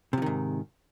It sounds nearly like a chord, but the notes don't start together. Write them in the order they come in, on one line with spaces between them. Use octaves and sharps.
C3 F3 D#3 G#2